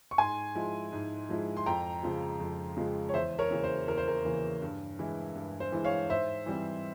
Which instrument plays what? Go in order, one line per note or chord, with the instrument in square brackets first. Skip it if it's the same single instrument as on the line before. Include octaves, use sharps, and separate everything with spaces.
[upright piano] C#6
G#2 G#5 C6
F3 G#3 E4
G#2
F3 G#3 E4
C6
F2 G5 A#5
C#3 F3 G#3
F2
C#3 F3 G#3
C#5
E2 C5 E5
A#4 C#5
C#3 E3 A#3
C5
E2 A#4
C5
A#4
C#3 E3 A#3
G2
E3 G#3 E4
G2
C5
E3 G#3 E4
C#5 F5
G#2 C5 E5
E3 G3 C4